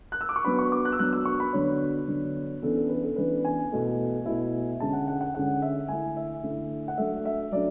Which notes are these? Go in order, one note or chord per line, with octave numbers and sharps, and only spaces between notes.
F#6
E6
D6
C#6
F#3 B3 D4 B5
C#6
D6
F#6
E6
F#3 B3 D4 F#6
E6
C#6
B5
D3 F#3 B3 D4 C#5
D3 F#3 B3 D4
C#3 E3 B3 D4 A4
A4
B4
A4
C#3 E3 B3 D4 B4
G#5
B2 A3 E4
B2 A3 E4
D3 G#3 C#4 A5
F#5
F#5
F#5
D3 G#3 C#4 F#5
E5
D3 A3 E4 G#5
E5
D3 A3 E4
F#5
F#3 A3 D4 E5
E5
F#3 A3 D4 D5